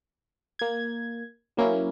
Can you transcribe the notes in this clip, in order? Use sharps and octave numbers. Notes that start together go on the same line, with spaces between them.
A#3 G#6
F#3 A#3 C#4 E4